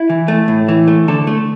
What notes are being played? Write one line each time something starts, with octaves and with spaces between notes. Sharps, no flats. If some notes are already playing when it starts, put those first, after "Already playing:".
Already playing: E4
E3
A3
A2
E3
A3
D3 A4
A3